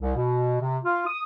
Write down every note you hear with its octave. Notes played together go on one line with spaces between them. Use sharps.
C2
B2
C3
F4
D#6